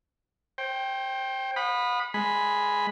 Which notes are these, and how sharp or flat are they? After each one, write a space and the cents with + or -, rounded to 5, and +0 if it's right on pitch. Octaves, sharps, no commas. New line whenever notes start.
C5 +30 G5 -5
F#5 -45 B5 +0 D#6 -25
G#3 +0 B5 +0